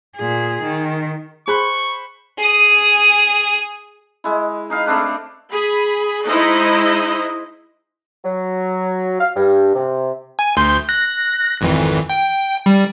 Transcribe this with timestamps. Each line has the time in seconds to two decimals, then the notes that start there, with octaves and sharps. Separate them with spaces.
0.16 A#2 G#4
0.63 D#3
1.48 G#4 C5 B5 C#6 F#6
2.38 G#4 D#6
4.24 G#3 E4
4.70 D#4 G#4 F5 B5
4.86 A3 C4 D4 B4
5.51 G#4 B5
6.26 G#3 D#4 E4 C5 D#5
8.24 F#3
9.20 F5
9.35 G2
9.74 C3
10.39 G#5
10.57 D2 C6 G6
10.89 F#6 A#6
11.61 G#1 F2 E3
12.10 G5
12.66 G3